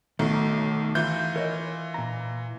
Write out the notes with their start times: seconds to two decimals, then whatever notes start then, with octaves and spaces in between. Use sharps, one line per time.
0.19 B1 D#3 A3 C#6
0.95 E3 E4 F4 G6
1.36 A#4 C#5 D#5
1.94 A#2 A#5